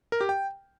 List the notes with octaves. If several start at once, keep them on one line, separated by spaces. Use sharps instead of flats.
A#4
G4
G5